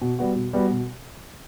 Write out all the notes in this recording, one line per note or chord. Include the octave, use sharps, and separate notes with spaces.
B2
G3 B3 F#4
B2
G3 B3 F#4
B2